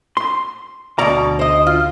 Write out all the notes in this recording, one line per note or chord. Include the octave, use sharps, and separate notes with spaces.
C6
D2 B2 D5 A#5
C5 D#5
F4